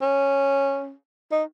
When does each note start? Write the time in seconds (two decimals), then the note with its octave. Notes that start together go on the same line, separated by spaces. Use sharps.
0.02 C#4
1.32 D#4